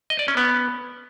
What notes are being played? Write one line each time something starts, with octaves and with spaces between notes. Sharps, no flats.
D#5
D5
C#4
B3